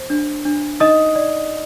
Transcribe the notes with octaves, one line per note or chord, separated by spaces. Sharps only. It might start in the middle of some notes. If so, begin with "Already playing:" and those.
Already playing: C5
D4
D4
D#4 D#5 D#6
D5